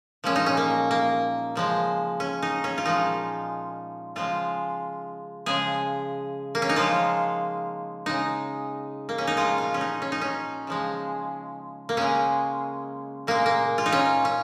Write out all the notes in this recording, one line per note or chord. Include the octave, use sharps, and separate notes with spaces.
A#2 F3 G#3 C#4
D#4
C#4
A#3
A#3
C#3 F3 G#3
C#4
D#4
C#4
F4
A#2 F3 G#3 D#4
C#3 F3 G#3 F4
C#3 F3 G#3 G#4
A#3
C#4
D#4
C#3 F3 G#3 F4
C#3 G#3 D#4
A#3
C#4
D#4
A#2 F3 G#3 F4
F4
C#4
D#4
C#4
D#4
C#4
C#3 F3 G#3
A#3
C#3 G#3 C#4
A#2 G#3 A#3
A#3
F4
D#4
C#4
C#4